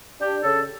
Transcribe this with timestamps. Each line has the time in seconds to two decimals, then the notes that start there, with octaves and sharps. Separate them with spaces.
0.21 D4 G4
0.43 C#3 A4